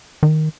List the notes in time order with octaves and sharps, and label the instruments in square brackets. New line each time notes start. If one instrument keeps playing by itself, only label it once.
[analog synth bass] D#3